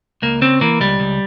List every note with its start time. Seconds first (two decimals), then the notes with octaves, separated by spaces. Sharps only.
0.22 C#2 A#3
0.42 C#3 C4
0.61 E3 A#3
0.80 C#2 G3
1.00 C#2